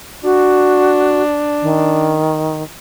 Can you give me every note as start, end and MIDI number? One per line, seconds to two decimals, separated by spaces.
0.24 2.23 62
0.24 1.23 66
1.62 2.63 51